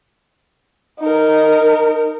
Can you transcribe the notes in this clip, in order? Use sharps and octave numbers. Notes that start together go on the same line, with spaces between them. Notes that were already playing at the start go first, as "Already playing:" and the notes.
D#4 A#4